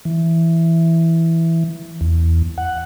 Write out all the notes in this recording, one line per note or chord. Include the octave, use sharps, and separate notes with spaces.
E3
E2
F#5